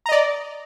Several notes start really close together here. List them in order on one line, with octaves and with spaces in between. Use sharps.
A#5 D#5 D5